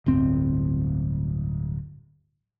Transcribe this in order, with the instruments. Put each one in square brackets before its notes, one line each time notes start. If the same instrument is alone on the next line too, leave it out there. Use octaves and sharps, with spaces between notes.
[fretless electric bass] D1 G1 C4